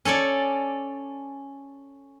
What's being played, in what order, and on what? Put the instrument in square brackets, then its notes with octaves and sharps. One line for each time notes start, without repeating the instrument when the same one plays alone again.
[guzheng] C#4 A4 C#5 D5